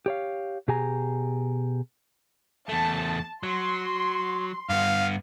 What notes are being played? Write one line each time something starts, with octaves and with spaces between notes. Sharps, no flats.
G4 C#5 F5
B2 G4 G#4 G#5 A#5
E2 A3 A5
F#3 C6
G2 B3 F5